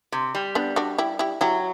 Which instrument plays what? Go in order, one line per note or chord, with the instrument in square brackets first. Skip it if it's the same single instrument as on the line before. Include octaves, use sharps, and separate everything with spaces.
[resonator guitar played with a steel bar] C3
G3
[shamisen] B3 D4
D4 F#4
E4 G4
E4 G4
[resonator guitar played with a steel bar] F#3 [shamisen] E4 G4